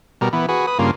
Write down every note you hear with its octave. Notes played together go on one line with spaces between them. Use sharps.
B2 G3 A#4
E3 B3
F#4 G#4 B4
B4 D#6
G2 C#3 A#3 F4